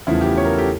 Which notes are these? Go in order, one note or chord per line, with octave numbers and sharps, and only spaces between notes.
E2 C#3 F3 A3 E4
G4
C#5
A#4
A4
G4